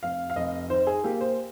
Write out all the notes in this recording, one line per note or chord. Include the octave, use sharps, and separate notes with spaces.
F1 F5
F5
F1 D#5
D#3 C5
G#4
A#3 G4
C5